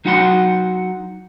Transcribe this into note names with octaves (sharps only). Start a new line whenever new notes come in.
F#3 D#4 F#4 F#5 G#5 C6